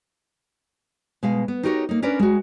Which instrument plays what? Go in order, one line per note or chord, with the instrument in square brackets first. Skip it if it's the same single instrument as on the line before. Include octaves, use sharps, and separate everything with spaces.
[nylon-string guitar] B2 G#3 F5
B3
D#4 F#4 G4 A#4 C5 C#5
A#3 D#4
C#4 D4 A#4 B4 D5
G#3 F#4